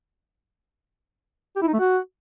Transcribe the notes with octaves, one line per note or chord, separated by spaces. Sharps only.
G4
E4
D#4
A3
F#4